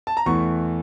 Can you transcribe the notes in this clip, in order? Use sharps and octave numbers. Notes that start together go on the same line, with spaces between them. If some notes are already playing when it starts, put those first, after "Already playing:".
A5
A#5
E2 E3 A3 C#6